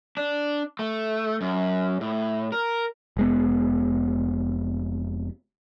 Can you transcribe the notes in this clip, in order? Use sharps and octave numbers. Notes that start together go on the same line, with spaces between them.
D4
A3
F#2
A2
A#4
F1 G#3 B3